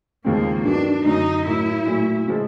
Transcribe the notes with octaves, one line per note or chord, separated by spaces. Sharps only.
D#2 C#3 F3 G#3 A#3 C4
G2 D#3 F#3 B3 D4
F#2 D3 F#3 D#4
A2 F#3 A#3 E4
A#2 F#3 A3
C#3 F3 G#3